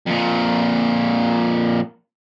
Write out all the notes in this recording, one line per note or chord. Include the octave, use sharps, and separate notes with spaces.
F2 A#2